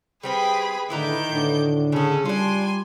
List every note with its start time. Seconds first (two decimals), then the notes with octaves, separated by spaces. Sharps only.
0.23 G3 C4 G#4 B4 G5 B5
0.90 A2 D3 D#3 E4 B4 A#5 D6 G6
1.31 A2 D3
1.92 C#3 C#4 G#4 A4
2.25 G3 D4 F4 G#5 C6